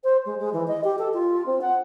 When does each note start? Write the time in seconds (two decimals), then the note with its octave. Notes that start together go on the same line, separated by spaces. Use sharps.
0.03 C5
0.25 G#3
0.39 G#3
0.52 E3
0.67 D#5
0.83 G4
0.98 A4
1.13 F4
1.45 C4
1.61 F#5